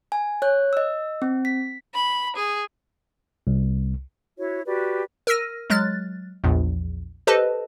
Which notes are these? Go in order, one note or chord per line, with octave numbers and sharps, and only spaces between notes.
G#5
C#5 F#6
D#5 E6
C4
B6
B5
G#4
C2
E4 F#4 C#5
F#4 G4 B4 D5
A#4 E6 F6 A#6 D#7
F#3 G#3 F6 F#6 A6
A#1 E2 A#2
G4 A4 B4 C5 D#5 A5